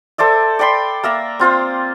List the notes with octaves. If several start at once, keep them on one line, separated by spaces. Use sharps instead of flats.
A4 C5 D5 E5
D5 G5 B5 C6
A#3 E5 A#5
C4 F4 C5 F5